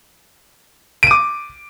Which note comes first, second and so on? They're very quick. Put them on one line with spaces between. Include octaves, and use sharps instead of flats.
D7 D#7 D6